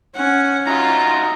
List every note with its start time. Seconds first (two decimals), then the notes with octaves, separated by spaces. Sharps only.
0.16 C#4 F#5
0.67 D#4 F4 F#4 E5 A#5